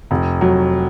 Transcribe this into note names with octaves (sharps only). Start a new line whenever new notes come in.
F1
F#3